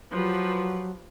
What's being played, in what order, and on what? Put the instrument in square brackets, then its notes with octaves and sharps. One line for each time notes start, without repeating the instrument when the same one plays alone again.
[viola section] F3 G4 B4 [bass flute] F#3